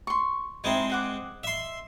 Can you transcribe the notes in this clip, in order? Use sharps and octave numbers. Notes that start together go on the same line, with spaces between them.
C6 C#6
G#3 C4 D#4 E4 C5
D#5 F#5 D6
E5 C6